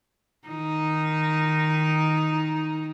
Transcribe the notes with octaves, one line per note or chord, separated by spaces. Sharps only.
D#3 D#4